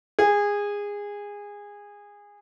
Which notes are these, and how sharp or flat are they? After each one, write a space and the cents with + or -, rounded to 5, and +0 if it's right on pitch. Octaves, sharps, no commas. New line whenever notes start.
G#4 -20